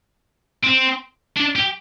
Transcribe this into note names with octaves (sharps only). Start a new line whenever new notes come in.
C4
D4
G4